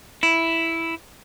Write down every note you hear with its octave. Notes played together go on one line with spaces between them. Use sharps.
E4